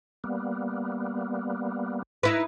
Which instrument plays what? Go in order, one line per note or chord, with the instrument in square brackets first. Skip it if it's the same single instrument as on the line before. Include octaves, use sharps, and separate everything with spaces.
[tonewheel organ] G3 A#3 B3
[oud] D#4 E4 B4